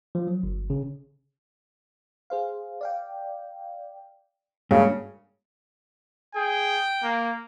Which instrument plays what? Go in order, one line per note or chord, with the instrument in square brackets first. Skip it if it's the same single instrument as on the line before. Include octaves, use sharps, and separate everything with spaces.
[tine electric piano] F3
F#3
G1
C#3
[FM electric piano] G#4 C5 F5
D5 F5 G5
[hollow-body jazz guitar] G2 [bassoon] C#3 [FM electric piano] G#3 A#3 F#4
[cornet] G#4 [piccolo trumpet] G5
[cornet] A#3